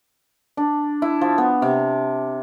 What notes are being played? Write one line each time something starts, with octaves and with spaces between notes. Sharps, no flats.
D4
E4
F3
B3
C3